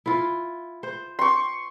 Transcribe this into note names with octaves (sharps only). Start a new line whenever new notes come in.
E4 F4
C5
C6 C#6